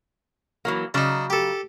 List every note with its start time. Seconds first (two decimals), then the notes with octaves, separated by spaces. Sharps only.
0.65 E3 F#3 A#3
0.94 C#3 F#3 D4 D#4
1.30 G4 A4